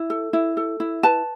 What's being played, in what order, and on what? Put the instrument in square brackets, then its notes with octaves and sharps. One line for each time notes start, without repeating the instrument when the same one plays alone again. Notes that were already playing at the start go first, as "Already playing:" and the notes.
Already playing: [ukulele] E4
A4
E4
A4
E4
B4 A5